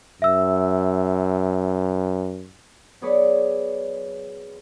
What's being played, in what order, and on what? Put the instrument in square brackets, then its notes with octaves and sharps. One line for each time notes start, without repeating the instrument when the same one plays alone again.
[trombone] F#2 [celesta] E5 E6
[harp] F#3 B3 G#4 C#5 D5 B6